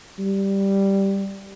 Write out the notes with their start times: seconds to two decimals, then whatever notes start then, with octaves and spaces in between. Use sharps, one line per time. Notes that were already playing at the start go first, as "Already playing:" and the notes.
0.19 G3